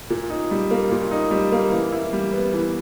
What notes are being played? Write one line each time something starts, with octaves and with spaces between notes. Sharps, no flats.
A#2
D#4
G3
A#3
A#2
D#4
G3
A#3
E3
E4
G3
B3
E3